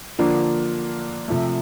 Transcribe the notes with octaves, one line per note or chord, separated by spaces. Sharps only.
D3 F3 A#3 D4 F4
C3 F3 A3